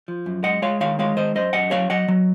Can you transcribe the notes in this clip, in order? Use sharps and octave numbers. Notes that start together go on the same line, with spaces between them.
F3
F#2
G#3 D#5 F#5
G#3 C#5 F5
D#3 C#5 F5
G#3 C#5 F5
D#3 C5 D#5
F#2 C5 D#5
F#2 D#5 F#5
F#3 C#5 F5
F#3 D#5 F#5
F#3